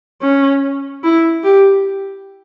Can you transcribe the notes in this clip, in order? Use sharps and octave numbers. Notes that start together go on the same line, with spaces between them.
C#4
E4
G4